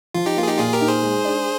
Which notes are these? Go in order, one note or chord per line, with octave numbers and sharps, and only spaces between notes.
F3 F4
D#4 G4
A#3 F4
G#4
D#4 G4
A#2 F4 G#4
G4 A#4
D#4
G#4 C5
G#3
D4